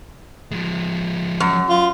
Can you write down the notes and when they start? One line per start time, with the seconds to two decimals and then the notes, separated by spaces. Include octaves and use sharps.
0.52 F3 G#3
1.40 F#2
1.69 F4